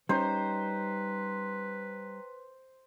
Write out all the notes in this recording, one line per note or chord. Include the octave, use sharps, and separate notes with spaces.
G3 C#4 D#4 B4 C5 G5 A#5